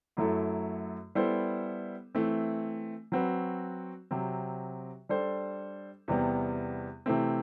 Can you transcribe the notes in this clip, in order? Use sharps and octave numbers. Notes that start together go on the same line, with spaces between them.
F#2 F#3 A3 E4 A4
G3 B3 E4 A4 C5
E3 A3 C4
F#3 C4 F#4 B4
C3 F#3 C4
G3 D4 A4 C5
E2 C3 G3 B3
C3 E3 A3 C4